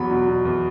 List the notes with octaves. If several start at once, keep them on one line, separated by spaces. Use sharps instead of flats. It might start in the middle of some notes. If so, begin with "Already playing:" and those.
Already playing: E2 F#3 B5
B2
B2
E2